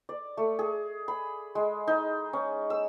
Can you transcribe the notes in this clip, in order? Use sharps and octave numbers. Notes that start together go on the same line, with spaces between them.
D5
A3
G#4
B5
G#3
D#4
C#4
E6